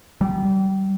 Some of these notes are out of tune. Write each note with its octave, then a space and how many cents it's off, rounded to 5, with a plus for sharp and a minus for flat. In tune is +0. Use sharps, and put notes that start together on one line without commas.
G3 -30